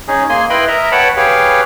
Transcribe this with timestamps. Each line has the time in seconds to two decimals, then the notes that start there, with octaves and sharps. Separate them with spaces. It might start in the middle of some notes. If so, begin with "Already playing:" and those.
0.08 C#4 D#4 G#4
0.29 A#3 G#4 G#5 C6
0.50 E4 B4 D#5 G5 B5 C6
0.68 A#4 D#5 E5 A#5
0.92 B4 C#5 F#5 G5 A5 B5
1.17 G4 G#4 B4 C#5 F5 G5